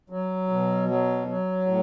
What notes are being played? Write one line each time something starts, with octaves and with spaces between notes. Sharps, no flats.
F#3
B2
F#3
F#3
A2